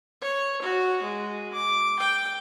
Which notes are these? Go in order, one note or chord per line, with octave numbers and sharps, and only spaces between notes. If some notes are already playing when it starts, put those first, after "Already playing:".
C#5
F#4
G#3
D6
G5